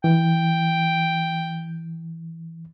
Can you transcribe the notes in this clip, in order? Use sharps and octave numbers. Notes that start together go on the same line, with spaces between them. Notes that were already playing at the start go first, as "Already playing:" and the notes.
E3 G5